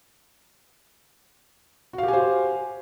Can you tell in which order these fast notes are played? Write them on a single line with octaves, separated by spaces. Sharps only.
F#4 F5 G4 G#5 C5